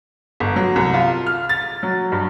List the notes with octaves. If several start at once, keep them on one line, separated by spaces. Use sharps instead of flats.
G1
F#3
C2
F4
F6
A6
F#3
G2